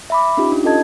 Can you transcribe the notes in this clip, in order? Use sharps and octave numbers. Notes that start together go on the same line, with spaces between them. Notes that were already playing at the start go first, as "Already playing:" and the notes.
E5 B5 D6
C#4 D#4 F4 G4
D4
C#4 F4 A4 D#5 A5 G#6